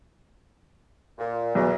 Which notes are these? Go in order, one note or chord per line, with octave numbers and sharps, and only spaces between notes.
A#2
B1 E2